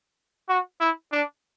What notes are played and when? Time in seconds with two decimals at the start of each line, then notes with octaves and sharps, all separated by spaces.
0.49 F#4
0.80 E4
1.12 D4